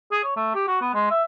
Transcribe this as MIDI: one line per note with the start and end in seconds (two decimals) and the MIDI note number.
0.11 0.21 68
0.24 0.36 73
0.36 0.51 57
0.54 0.66 67
0.67 0.78 66
0.81 0.92 59
0.94 1.06 56
1.10 1.23 76